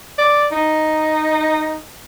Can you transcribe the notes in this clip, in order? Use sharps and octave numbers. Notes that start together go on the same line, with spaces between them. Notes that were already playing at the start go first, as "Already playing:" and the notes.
D5
D#4